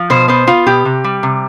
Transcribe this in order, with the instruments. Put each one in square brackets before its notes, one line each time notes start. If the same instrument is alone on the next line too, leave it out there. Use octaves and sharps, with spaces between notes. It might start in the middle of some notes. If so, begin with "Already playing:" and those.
Already playing: [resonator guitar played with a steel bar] F3
B2 C5
B3 C5
B3 F4
B2 G4
C3
G3
C3